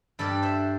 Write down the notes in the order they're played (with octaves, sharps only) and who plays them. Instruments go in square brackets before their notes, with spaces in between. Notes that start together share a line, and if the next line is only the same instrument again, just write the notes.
[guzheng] G2 G3 D4 A4 D5
C5 E5